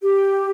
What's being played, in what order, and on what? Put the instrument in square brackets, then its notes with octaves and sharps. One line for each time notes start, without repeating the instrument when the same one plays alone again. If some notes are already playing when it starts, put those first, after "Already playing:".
[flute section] G4